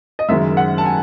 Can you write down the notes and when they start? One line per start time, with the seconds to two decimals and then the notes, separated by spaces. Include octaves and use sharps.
0.19 D#5
0.29 F#1 F#2 D#3 G#3 E5
0.57 F#5
0.78 A5
0.85 G#5